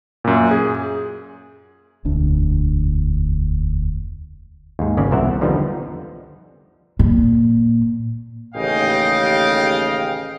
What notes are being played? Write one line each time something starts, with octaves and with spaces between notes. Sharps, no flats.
F#2 A#2
G#4
E1 D2 D4
D#2 G#2
G#1 C#3 C#4 D5
C2 A#2 A#4 C5 E5 F#5
E2
D3 F3 G3 B3 D#4
A#2
A1 D#2 C#3 D#5 F5 G5